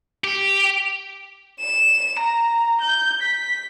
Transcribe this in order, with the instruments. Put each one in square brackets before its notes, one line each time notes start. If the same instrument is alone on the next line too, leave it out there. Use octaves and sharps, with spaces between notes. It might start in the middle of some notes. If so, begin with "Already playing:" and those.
[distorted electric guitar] G4
[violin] E7
A#5
G6
B6